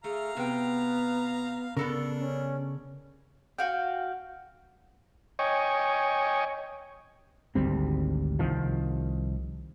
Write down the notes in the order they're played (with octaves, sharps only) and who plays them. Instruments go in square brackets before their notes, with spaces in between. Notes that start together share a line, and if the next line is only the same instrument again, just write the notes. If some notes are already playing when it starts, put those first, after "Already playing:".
[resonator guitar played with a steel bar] A3 [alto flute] G#4 [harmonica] F5 A#5
[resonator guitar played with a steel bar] C3 G5 [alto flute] B3
[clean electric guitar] C#3 [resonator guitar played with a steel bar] B3 A4 A#4 [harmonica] D4
[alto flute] C#4
[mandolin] F#4 F5 G5
[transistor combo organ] C#5 D#5 G5 G#5 C#6
[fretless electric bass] G#1 D2 G3 C4
C2 D#3 F3